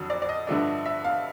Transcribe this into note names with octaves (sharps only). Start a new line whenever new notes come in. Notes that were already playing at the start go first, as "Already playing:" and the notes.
Already playing: F2 D3 F#3
D5
D5
D#5
G2 D3 F3 A3 D4
E5
F5